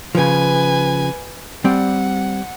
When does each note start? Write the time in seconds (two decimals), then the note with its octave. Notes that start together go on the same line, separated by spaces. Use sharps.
0.15 C#3 F3 B4 G#5
1.64 G3 C4 D5 F#5